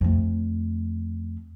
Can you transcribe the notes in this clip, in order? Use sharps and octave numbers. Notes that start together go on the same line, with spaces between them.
F2 A3